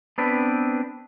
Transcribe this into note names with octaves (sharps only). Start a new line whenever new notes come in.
B3 C4 D4 B4